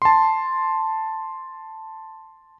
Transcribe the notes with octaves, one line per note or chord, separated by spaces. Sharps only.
A5 C6